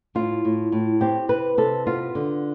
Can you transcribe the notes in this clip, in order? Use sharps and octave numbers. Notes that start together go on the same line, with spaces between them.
A2 F4
A2
A2
C4 G4
C3 B4
C3 A4
B3 F4
D3